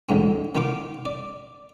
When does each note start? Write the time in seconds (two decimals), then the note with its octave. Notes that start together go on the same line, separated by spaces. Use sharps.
0.09 A1 D2 G#2 C4
0.55 D#3 B3 F4 F5 D6
1.05 D5